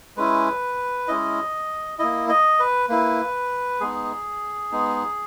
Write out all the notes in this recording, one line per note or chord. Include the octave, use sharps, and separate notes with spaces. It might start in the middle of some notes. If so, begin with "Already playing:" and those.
G#3 C#4 E4 B4
G#3 C#4 E4 D#5
A#3 E4 D#5
D#5
B4
A#3 E4 B4
G#3 B3 D#4 G#4
G#3 B3 D#4